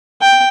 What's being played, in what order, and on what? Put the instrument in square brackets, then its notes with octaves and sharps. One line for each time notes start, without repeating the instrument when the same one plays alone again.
[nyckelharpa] G5